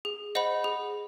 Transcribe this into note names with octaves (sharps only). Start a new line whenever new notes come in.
G#4
C5 D#5 F#5 B5
G#4